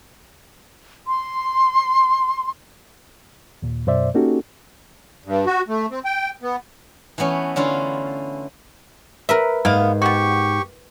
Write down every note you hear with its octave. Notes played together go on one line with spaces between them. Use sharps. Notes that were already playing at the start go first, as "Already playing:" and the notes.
C6
D#2 A#2
F#2 B2 C5 D5 E5
A#3 C#4 D#4 F#4 G4 A4
G2
F#4
A3
C4
G5
B3
E3 A3 B3 C#4
D3 C#4 E4 F4
A#4 B4 E5
G#2 A#3 B3 F5
B3 F#4 G4 C#6